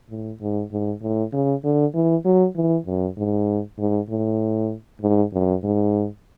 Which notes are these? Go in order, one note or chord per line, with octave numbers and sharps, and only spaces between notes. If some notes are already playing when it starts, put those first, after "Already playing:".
A2
G#2
G#2
A2
C#3
D3
E3
F#3
E3
F#2
G#2
G#2
A2
G#2
F#2
G#2